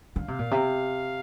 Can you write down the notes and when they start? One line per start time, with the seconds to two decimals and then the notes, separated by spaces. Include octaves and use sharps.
0.16 D3 F5
0.28 C3
0.39 A#2
0.51 C3